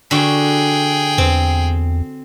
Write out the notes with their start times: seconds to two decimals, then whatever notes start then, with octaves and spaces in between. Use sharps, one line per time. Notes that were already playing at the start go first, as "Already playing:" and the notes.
0.11 D3 F#4 G#4 G5
1.18 E2 C4